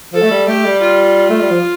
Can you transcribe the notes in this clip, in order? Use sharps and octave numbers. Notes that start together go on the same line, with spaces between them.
F3 A4
A3
G3
A3 G4
G3
F4
A3
G3
F3